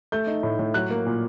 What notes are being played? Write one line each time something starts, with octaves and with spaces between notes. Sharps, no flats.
A3 G6
D#4
A2
A2
F#3 F#6
A#3
A#2